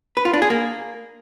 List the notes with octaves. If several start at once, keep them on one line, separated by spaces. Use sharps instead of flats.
B4
F4
D4
G#4
A#3